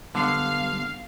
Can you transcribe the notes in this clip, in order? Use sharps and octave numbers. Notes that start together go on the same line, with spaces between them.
D3 G3 B3 F5 F#5